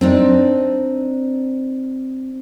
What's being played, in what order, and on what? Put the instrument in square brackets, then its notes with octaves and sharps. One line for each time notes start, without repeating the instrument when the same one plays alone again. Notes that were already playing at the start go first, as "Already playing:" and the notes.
[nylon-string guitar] C4 D4 D#4